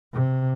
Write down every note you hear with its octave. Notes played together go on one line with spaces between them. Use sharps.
C3